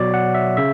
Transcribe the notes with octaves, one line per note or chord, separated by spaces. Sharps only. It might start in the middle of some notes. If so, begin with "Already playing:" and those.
Already playing: B2 F#3 C#5 D5
F#5
E5
C#3 E5